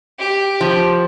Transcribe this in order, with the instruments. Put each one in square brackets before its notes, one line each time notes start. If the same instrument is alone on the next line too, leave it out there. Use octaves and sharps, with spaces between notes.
[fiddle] G4
[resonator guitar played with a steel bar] F3